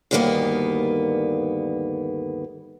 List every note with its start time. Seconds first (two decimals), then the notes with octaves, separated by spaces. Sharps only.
0.11 D2 G2 D#3 G3 A#3 B3